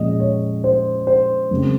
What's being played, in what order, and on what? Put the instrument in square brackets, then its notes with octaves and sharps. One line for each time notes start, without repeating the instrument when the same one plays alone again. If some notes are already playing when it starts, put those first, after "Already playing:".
Already playing: [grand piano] A#2 F3 G#3 C#4 D#5
C#5
C5
C5
F#2 C#3 G#3 C4